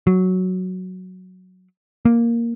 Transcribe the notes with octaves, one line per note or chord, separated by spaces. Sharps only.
F#3
A#3